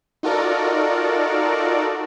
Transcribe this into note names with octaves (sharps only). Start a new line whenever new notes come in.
D#4 F4 F#4 A4 A#4 D5